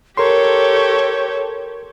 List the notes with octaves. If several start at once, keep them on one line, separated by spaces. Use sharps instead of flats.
G4 A4 A#4 C#5 C6